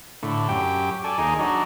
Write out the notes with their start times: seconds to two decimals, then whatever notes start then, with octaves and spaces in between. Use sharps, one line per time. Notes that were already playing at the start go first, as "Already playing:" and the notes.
0.23 A2 D3
0.49 F#2 G4 G5
1.04 A4 D5 G#5
1.18 D#2 D#4 G#4 G#5
1.39 F#3 D4 D#4